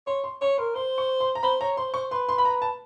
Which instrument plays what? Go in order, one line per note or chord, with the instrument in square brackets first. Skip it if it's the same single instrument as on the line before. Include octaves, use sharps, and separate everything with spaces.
[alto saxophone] C#5 [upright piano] C6
[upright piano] C6
[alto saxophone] C#5 [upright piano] C#6
[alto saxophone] A#4 [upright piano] C6
[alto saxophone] C5 [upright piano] C6
[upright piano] C#6
C6
A#5
[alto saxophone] C5 [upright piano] B5
[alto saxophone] C#5 [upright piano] A#5
[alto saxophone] C5 [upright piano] C6
[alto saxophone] C5 [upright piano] C#6
[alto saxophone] B4 [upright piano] C6
[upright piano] C6
B5
A#5
A5